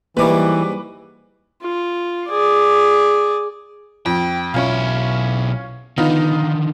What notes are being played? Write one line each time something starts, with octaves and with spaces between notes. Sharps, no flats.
G#2 E3 F#3 G3 A#3 B4 D6
F4
G#4 D5
F2 G5
B1 C#4 E4 F4
D3 D#3 B3 D#4 F4